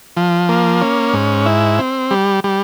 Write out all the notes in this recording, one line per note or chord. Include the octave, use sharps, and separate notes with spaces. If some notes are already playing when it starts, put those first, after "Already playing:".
F3
A#3
C#4
G#2
E4
C4
G3
G3